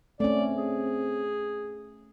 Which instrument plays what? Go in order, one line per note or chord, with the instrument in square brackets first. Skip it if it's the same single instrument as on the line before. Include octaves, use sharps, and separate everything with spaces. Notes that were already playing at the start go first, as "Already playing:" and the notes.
[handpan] A3 C#4 [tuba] C4 [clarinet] D5
[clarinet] G#4